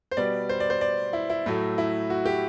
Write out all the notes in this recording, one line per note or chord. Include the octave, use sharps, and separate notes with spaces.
C5
B2 G3 B3 D5
C5
D5
C5
D5
E4
E4
A2 F#3 A3
E4
F#4
G4